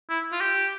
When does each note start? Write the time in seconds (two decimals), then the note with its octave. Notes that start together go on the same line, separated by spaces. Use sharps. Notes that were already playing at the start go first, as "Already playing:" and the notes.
0.09 E4
0.32 F4
0.40 G4